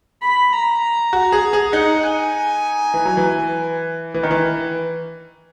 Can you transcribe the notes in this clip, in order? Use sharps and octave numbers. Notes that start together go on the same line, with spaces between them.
B5
A#5
F#4
G#4
G#4
D#4 F#5
G#5
E3
F#3
E3
E3
D#3
E3